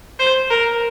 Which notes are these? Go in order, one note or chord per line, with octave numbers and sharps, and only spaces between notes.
C5
A#4